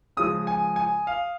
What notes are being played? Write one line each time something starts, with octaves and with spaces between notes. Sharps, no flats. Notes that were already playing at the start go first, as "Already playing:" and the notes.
C#3 F3 G#3 D#6
G#5
G#5
F5